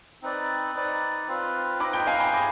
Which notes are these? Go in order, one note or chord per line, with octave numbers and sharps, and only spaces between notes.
C4 D#4 B4 D5
D#4 B4 D5
C4 F4 B4
D#4 B4 D#5 B5 D6
G5 B5
F5 G#5
G5 B5
D#4 G#4 C5 B5 D6